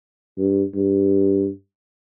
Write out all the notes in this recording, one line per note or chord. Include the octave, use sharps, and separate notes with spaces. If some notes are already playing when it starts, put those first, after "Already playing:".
G2
G2